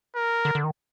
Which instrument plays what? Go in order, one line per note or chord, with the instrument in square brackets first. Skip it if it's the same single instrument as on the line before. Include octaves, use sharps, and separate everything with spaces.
[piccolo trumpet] A#4
[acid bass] D3
D3
D#3